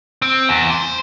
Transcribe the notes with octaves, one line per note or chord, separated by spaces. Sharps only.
C4
E2
C5